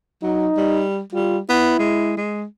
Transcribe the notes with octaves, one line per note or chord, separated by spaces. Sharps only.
F#3 D#4
G3
G3 F4
B3 E4
G#3
G#3